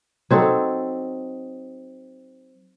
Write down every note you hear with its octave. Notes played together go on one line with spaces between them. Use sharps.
F#3 C4 D#4 A4